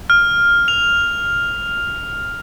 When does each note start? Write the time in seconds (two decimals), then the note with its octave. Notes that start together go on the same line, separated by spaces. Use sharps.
0.10 F6
0.68 F7